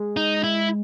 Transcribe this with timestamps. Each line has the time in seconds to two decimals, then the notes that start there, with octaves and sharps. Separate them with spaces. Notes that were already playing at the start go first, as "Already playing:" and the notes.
Already playing: G#3
0.17 D#4
0.44 E4